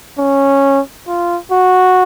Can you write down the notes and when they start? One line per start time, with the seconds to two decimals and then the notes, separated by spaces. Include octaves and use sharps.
0.18 C#4
1.07 F4
1.51 F#4